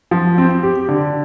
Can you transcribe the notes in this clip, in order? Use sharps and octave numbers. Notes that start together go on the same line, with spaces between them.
F3
C4
G4
D3